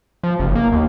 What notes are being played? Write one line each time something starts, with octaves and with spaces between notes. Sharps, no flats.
F3
F#1
A#3
D#2